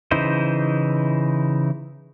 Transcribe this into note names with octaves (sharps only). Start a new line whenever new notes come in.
C#3 E3 D#4 E4 C5